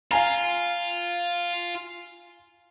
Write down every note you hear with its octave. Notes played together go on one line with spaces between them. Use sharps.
F4 F5 G#5 A#5